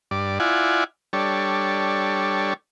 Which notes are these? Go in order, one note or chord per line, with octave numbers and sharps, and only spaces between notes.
G2 D5
E4 F4 D5 F#5 G#5
G3 D4 A4 C#5